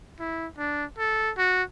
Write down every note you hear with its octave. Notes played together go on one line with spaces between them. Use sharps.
E4
D4
A4
F#4